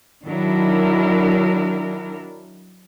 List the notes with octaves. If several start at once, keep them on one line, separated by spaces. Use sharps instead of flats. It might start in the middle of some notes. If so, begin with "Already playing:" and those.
D#3 F#3 D4 E4 A#4